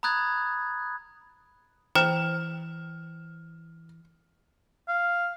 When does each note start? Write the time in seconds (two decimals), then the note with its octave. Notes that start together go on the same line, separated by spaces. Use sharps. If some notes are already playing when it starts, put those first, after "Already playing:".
0.03 A#5 B5 D#6 F#6 G#6 A6
1.95 E3 C5 G5 A#5 F6 E7
4.88 F5